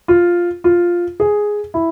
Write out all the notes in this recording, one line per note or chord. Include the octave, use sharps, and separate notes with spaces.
F4
F4
G#4
E4